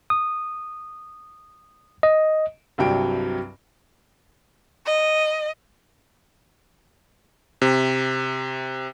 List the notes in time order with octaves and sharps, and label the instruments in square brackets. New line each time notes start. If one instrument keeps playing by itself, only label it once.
[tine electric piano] D#6
D#5
[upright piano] C2 G2 C3 F#3 G5 D7
[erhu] D#5
[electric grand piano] C3